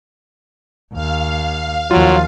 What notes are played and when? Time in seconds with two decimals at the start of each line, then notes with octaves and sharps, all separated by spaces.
0.93 D#2 F5
1.91 D#2 F3 F#3 F4